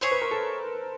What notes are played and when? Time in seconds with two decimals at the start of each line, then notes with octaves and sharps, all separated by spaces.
0.01 G#4 C5 C#5 E5
0.11 B4
0.22 A#4
0.31 A4